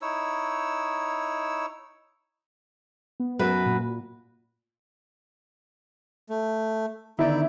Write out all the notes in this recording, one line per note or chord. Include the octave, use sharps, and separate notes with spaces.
D#4 E4 C#5 E6
B3
F#2 F#4 B4
A#2
A3
D3 D#3 B3 D#4 E4 D5